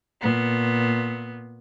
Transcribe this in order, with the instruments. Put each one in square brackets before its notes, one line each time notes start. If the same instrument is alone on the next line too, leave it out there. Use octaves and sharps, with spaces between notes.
[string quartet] A#2 B3